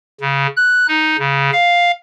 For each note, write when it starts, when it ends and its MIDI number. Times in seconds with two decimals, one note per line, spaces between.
0.21 0.47 49
0.57 0.87 90
0.88 1.17 63
1.19 1.50 49
1.53 1.91 77